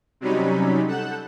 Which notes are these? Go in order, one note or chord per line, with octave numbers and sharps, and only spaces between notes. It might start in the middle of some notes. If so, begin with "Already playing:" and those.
C3 F#3 G3 C#4 D#4 B5
A4 F#5 F#6 G6 E7